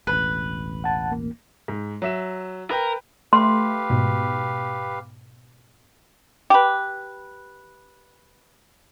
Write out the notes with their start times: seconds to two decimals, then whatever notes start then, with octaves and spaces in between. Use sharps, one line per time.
0.07 E1 A1 B4
0.84 F#5 A5
1.12 A#3
1.68 G#2
2.02 F#3 E5 E7
2.71 A#4 B4 G5
3.33 A3 G4 B4 F5 C6
3.90 G#2 B2
6.50 G4 B4